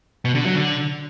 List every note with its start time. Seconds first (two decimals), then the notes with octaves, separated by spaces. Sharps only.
0.25 B2
0.35 D3
0.45 F#3
0.55 D3